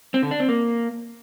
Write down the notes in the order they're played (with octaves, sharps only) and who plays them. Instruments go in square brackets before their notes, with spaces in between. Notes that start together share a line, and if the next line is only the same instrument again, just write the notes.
[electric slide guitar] C4
D3
D4
C4
A#3